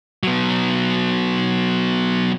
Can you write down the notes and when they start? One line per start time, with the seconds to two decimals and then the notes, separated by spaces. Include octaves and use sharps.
0.23 F#3 B3